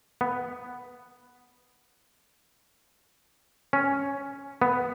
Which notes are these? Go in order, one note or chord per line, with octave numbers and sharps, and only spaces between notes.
B3
C#4
B3